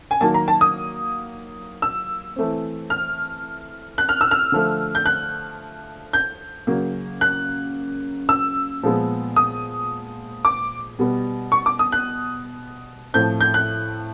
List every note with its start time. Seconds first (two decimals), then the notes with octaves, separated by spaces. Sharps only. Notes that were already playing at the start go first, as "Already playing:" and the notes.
0.11 G#5
0.21 D#3 F#3 A#3 A5
0.34 A#5
0.48 A5
0.61 D#6
1.82 E6
2.36 E3 A3 C4
2.90 F6
3.98 F#6
4.09 F6
4.21 E6
4.31 F6
4.52 D3 F3 A3
4.95 G6
5.06 F#6
6.13 G6
6.67 C#3 F#3 A#3
7.21 F#6
8.29 E6
8.83 A#2 F3 G#3 B3
9.36 D#6
10.45 D6
10.99 B2 G3 B3
11.52 C#6
11.66 D6
11.79 D#6
11.92 F#6
13.14 A2 F3 A3 C4 G6
13.41 G6
13.54 F#6